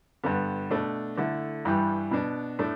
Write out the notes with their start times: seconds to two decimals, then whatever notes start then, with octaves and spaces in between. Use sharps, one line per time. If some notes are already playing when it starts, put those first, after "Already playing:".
0.24 G2 D3 B3
0.71 B2 A3 D4
1.18 D3 A3 E4
1.65 G2 E3 G3
2.11 B2 B3 D4
2.59 A2 A3 D4